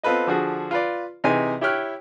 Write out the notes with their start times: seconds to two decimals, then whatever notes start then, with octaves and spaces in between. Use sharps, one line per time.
0.03 B3 C4 F4 A4 B4 D#5
0.27 D3 F3 F#4 G#4
0.71 F4 B4 D5
1.24 C3 E3 D#4 G#4 G#5
1.61 E4 G4 C#5 G5 F6 F#6